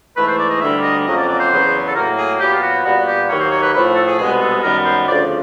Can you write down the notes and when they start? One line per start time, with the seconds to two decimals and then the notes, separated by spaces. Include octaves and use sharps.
0.17 G#2 E3 A3 B4
0.28 C5
0.39 D5
0.50 D#5
0.61 D2 D3 G3 A#3 E5
0.84 D#5
1.06 F2 C#3 F#3 A#3 D#5
1.17 D5
1.29 D5
1.40 C5
1.51 E2 C#3 F#3 B3
1.88 A4
1.96 A2 F#3 A#3 A#4
2.18 G#4
2.40 A#2 F#3 B3 G4
2.54 F4
2.63 F#4
2.85 A#2 G3 B3 F#4
3.08 G4
3.29 D#2 D#3 F#3 A#3 C#5
3.40 C5
3.52 C#5
3.63 B4
3.74 A2 F3 A3 B4
3.96 A4
4.08 G#4
4.19 C2 B2 G#3 B3 G#4
4.41 A4
4.63 F#2 D#3 G3 B3 A#4
4.86 C5
5.07 D2 C#3 F3 D5